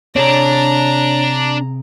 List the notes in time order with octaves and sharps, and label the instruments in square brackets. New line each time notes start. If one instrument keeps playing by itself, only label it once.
[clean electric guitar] C3 G#4 D5 [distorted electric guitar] D4 [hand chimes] C#5 [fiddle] A#5